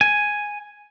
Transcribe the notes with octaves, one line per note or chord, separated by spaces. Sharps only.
G#5